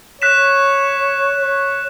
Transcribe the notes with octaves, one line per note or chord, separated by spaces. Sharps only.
C#5 F#6 B6 E7
C#5